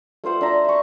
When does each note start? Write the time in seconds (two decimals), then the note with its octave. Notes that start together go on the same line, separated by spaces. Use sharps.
0.24 A3 F4 C5 F#5
0.41 D4 E5 A#5
0.65 E5 C#6